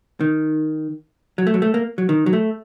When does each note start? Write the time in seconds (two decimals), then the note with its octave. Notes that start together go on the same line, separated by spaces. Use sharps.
0.20 D#3
1.38 F#3
1.47 A3
1.54 F#3
1.62 A3
1.74 A#3
1.98 F#3
2.09 D#3
2.26 F#3
2.33 A3